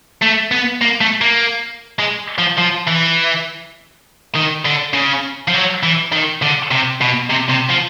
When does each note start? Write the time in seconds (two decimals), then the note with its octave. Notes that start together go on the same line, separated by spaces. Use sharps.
0.22 A3
0.51 B3
0.82 A#3
1.01 A3
1.21 A#3
1.99 G#3
2.38 F3
2.58 F3
2.88 E3
4.36 D#3
4.65 D3
4.94 C#3
5.48 F3
5.54 F#3
5.83 E3
6.12 D#3
6.42 D3
6.71 C3
7.01 B2
7.30 C3
7.50 C3
7.70 F3